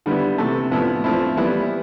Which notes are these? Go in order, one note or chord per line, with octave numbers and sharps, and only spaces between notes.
D3 G3 B3 E4
C3 E3 A3
A2 F3 B3 E4
F3 A3 C4 E4
E3 G3 B3 E4